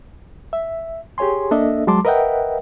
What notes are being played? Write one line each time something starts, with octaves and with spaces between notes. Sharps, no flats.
E5
G4 G#4 C#5 G#5 C6
A#3 D4 A4 D#5 E5
F#3 G#3 A5 C6 D6
A#4 B4 D#5 E5 F#5 G5